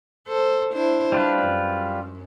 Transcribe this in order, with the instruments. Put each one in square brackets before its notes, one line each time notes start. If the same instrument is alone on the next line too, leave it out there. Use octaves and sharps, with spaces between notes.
[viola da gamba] A4 C5
D4 E4 C5
[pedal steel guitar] G3 F4 B4 [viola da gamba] D4
[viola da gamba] F#2